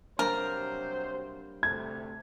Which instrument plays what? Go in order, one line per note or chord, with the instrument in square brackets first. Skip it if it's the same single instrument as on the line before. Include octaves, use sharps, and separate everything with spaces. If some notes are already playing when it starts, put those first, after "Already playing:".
[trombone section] C3 F#3 C5 [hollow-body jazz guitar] G3 A#3 D4 [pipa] A#4
[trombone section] D2 C3 A3 [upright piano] G#6